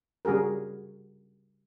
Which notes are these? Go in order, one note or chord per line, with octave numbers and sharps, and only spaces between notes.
C#3 G3 F#4 G#4 A#4